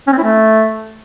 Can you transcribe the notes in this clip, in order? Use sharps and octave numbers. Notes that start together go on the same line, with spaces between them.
C#4
C4
E4
A3